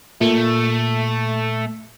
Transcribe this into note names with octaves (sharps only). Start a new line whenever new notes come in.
A#2 A3